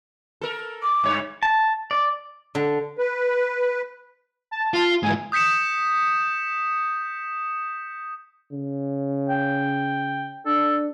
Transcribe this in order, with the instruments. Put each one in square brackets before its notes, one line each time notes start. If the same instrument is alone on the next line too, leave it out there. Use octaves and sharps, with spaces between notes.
[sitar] A4 A#4
[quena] D6
[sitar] G2 C#5
[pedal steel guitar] A5
D5
[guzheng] D3
[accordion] B4
[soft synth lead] A5
[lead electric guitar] F4
[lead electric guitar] G#2 E3 [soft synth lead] G#5
[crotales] D#6 G6 B6 C#7 E7
[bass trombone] C#3
[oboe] G5
[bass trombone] D4 [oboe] A4